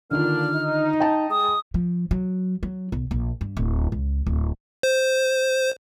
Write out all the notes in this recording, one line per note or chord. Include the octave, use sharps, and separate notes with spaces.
D3 D#3 A#3 D4 F4 F6
D#4
G5 A5
G#3 D#6
F3
F#3
F#3
B1
A#1
G2
D1
C#2
D1
C5